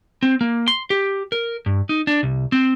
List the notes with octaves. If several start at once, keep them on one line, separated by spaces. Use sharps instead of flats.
C4
A#3
C6
G4
A#4
G2
D#4
D4
C2
C4